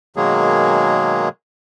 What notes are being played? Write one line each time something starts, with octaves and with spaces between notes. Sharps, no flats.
B2 D#3 F#3 G#3 A#3 G#4